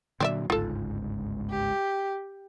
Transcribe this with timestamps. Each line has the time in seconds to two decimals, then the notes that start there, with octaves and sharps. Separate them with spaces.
0.20 A#2 D3 F#3 C4 D5 E5
0.50 G1 C#2 G#2 F4 A4
1.50 G4